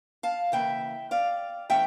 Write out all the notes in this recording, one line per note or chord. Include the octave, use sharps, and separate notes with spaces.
F5 A5
C#3 E3 A#3 E5 G5
D5 F5
E3 A3 C#4 E5 G5